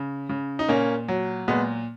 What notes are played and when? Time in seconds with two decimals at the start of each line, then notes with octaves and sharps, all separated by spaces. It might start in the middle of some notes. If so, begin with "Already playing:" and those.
Already playing: C#3
0.29 C#3
0.59 D#4
0.69 A#2 A#3 C#4
1.08 F#3
1.48 A#2 G#3 B3